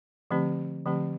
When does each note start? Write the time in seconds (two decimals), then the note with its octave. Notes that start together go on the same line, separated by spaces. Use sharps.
0.31 D3 F3 A3 C4 G4
0.86 D3 F3 A3 C4 G4